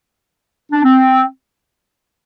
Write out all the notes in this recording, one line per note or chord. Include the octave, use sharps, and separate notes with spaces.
D4
C4